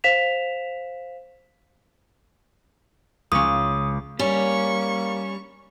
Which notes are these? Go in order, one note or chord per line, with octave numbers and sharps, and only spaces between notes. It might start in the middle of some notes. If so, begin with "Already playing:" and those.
C5 F5 B6 E7 F7
C#2 C#4 D#6
G3 A#3 C#4 C#6